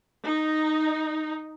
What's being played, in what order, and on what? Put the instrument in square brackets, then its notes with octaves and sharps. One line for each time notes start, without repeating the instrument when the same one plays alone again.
[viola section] D#4